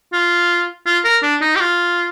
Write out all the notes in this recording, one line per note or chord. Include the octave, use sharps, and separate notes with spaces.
F4
F4
A#4
D4
D#4
G4
F4